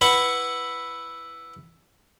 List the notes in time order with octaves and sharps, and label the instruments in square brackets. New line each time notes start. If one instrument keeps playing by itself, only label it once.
[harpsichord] E4 B4 F#5 B5 C#6